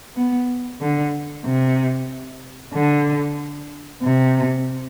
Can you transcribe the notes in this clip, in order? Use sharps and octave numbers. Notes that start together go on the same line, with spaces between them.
B3
D3
C3
D3
C3